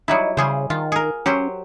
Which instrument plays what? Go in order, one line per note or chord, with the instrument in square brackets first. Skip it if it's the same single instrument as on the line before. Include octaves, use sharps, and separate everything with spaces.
[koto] F#3 G3 E4 [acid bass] D#4
[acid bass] C#3 [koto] G3 G#4 C5
[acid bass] D#3 [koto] F4
[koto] G#4 A#4
[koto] F#3 G4 C5 [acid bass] C#4